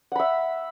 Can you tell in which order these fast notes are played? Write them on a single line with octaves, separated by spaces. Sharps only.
F#5 B5 E5